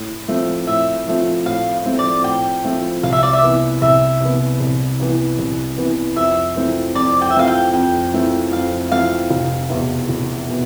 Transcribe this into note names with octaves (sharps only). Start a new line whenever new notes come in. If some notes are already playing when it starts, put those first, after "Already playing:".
Already playing: A2
F3 A3 C4 F4
A2 E5
F3 A3 C4 F4
A2 F5
F3 A3 C4 F4
D5
A2 G5
F3 A3 C4 F4
C2 F5
E5
D5
E5
C3 E3 B3
C2 E5
C3 E3 B3
C2
C3 E3 B3
C2
C3 E3 B3
F2 E5
E3 A3 C4 F4
F2 D5
G5
E5
E3 A3 C4 F4 F5
G5
F2 G5
E3 A3 C4 F4
F2 F5
E3 A3 C4 F4 F5
F1
E2 B2 B3 E4
F1
B2 B3